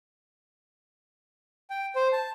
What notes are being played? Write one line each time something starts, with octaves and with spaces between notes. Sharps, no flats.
G5
C5
A5